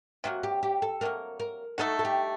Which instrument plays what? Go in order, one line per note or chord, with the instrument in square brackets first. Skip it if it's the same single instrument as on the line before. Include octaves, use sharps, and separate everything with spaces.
[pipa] C3 F#3 A#3 [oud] F#4
[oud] G4
G4
A4
[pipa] C3 F#3 A#3 [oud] A#4
[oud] A#4
[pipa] A3 D#4 F#4 [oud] A4
[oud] A4
G4